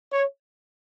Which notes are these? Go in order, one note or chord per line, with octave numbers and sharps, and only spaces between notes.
C#5